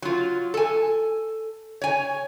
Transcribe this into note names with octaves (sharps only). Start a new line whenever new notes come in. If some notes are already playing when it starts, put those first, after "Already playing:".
F#3 F4
A4 G#5
C#5 G#5